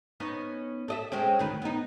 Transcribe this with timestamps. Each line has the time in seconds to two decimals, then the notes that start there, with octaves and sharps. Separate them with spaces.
0.20 B3 C#4 D#4
0.88 A4 D#5 E5
1.12 G#3 C4 C#4
1.39 D2 D#3 B4
1.62 B3 D#4